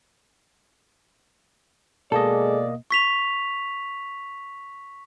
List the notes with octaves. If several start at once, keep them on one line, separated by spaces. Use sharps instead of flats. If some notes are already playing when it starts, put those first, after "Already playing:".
B2 G#3 A#3 A4 D5 D#5
C#6 B6 F7